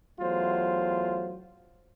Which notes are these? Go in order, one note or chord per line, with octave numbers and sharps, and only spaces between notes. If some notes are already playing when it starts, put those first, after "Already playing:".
E2 F#3 A3 F4 C5